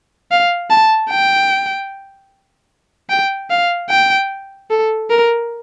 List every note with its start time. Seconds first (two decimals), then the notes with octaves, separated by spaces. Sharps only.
0.31 F5
0.70 A5
1.10 G5
3.10 G5
3.50 F5
3.90 G5
4.71 A4
5.10 A#4